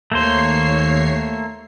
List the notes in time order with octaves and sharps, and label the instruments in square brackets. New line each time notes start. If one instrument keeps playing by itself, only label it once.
[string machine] D#2 C#5 C7 [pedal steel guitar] A3 A#3 C5